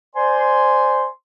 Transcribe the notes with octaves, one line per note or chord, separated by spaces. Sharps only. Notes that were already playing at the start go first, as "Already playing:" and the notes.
C5 D5 G#5 C6